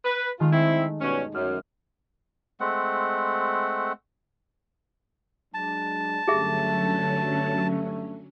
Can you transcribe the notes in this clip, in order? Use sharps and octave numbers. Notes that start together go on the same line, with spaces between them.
B4
D#3 G#3 A3 F4
C4 E4
G2 B2 C#4
F#2 F6
G#3 A3 C4 F#5
F#3 G#3 D4 A5
G2 D3 F#3 A3 C#4 G4 G#4 E5